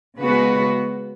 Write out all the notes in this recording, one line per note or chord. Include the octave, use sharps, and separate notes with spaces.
C#3 G#3 B3 F#4 B4